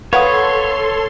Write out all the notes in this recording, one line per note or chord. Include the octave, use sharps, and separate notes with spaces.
A4 B4 C#5 F5 F#5 C6 D#6